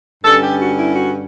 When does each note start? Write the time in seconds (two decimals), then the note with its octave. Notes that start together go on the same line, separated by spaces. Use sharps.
0.24 G2 D3 G3 C#4 A4
0.43 G4
0.60 F#4
0.78 E4
0.95 F#4